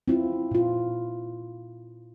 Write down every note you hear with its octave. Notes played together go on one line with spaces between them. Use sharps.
C4 E4 F4
A#2 F4